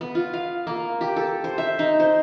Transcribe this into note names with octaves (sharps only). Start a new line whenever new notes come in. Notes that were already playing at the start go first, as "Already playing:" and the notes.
B3
F4
F5
A#3
G4
A4
C5
E5
D#4
C5